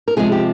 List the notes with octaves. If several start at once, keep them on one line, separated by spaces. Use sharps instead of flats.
A#4
C3 F3 G#3 G#4
G4